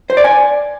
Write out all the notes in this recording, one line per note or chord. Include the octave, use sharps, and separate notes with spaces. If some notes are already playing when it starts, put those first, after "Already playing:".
C5
D5
G#5